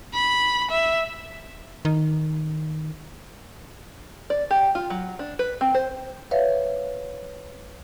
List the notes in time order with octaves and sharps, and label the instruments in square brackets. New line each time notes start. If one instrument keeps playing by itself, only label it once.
[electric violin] B5
E5
[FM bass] D#3
[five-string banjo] D5
G4
F4
F#3
D4
B4
C4
C5
[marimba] B4 C#5 E5 F5